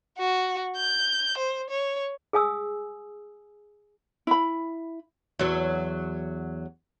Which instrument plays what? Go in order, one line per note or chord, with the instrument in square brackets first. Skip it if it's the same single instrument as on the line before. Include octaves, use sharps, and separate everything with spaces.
[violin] F#4
G6
C5
C#5
[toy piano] G#4 F5 G#5 D#6 E6
[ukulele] E4 B5
[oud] E2 F#3